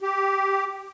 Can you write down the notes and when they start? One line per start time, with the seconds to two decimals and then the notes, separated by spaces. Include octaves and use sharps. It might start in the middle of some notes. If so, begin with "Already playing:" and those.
0.01 G4